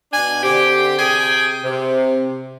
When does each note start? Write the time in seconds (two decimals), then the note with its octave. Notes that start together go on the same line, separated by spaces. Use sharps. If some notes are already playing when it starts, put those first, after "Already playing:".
0.12 B2 D4 G#5
0.43 D3 C4 G4
0.98 C3 G#4 G5 G#5
1.64 C3